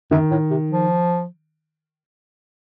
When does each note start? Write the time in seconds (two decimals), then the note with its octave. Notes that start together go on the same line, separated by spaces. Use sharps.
0.11 F#2 D#3
0.31 A2
0.50 C3
0.71 F3